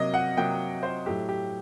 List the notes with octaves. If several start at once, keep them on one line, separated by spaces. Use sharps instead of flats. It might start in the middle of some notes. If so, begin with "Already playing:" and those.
Already playing: C3 F#3 A#3 D#5
F#5
C3 F#3 A#3 G5
C5
A2 F#3 A3 G4
G4